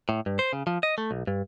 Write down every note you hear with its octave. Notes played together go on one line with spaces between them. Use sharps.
A2
G2
C5
C#3
F3
D#5
A3
B1
G2